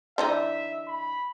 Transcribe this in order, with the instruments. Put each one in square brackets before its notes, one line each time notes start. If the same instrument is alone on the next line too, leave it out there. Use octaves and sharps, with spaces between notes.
[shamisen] D3 E3 D#4 [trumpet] E5
[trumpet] B5